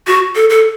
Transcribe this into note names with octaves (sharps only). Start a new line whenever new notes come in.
F#4
A4
A4